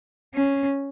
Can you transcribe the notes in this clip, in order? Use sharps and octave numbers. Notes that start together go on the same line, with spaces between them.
C#4